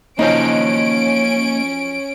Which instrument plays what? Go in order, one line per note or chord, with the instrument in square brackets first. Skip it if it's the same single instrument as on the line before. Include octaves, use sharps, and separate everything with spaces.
[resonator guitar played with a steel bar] F3 F#3 D#4 [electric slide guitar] A#3 C5 D#5 [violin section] C#4 D7